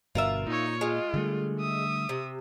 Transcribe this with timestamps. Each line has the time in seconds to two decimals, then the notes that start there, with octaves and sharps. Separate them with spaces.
0.15 G1 G2 B2 F4 A#4 E5
0.47 A#2 D#4 C#5
0.81 G#3 F4
1.14 D3 G3 A3
1.60 E5 D#6
2.09 C3